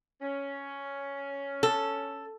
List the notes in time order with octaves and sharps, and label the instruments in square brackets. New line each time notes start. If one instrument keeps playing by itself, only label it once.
[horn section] C#4
[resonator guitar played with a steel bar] A4